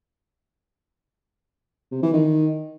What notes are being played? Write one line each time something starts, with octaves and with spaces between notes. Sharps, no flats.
C3
E3
D#3